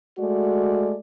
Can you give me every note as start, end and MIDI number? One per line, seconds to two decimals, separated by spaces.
0.19 0.96 56
0.19 0.96 57
0.19 0.96 66
0.19 0.96 74